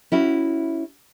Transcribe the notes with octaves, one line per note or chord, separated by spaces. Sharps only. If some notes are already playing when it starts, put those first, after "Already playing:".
C#4 E4 F#4